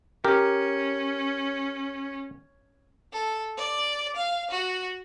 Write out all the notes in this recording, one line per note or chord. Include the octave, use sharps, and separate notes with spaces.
C#4 G4 A#4
A4
D5
F5
F#4